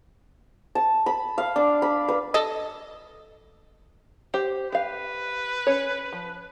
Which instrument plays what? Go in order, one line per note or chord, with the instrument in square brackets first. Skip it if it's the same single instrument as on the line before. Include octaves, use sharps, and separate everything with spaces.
[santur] A5
B5
F5
D4
B5
B4
[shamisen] A4 D#5
[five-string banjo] G4 C5
[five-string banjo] G4 F5 [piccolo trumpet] B4
[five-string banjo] C#4 C#5
F3